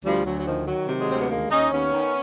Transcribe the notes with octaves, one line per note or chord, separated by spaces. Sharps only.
D2 F3 G3
D2 F#3
F#3
D#3 F3
D#3 F#3
C3
F#3 G#3
D2 C4
B3
D#2 G#3 A#3
D#2 C#4 D#4
D#2 B3 C#4
D#3